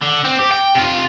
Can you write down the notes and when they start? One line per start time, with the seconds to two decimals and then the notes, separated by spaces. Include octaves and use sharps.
0.01 D3
0.24 C4
0.39 G4
0.52 G5
0.75 C3 F4